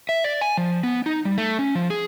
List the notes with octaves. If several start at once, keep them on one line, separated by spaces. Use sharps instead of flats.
E5
D5
G#5
F3
B3
D#4
G3
A3
C#4
F3
G#4